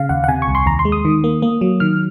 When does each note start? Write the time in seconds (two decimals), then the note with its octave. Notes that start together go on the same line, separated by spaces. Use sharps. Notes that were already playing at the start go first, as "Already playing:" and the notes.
Already playing: C#3 F5
0.09 D#2 F#5
0.24 F#5
0.28 C3 G#5
0.42 C#6
0.48 C2
0.55 C6
0.66 D#2 A#5
0.79 C6
0.85 G#3
0.92 D#6
1.05 D#3
1.24 A#3
1.42 A#3
1.61 F#3
1.80 D#3 F6